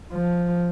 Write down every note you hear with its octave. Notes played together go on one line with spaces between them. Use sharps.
F3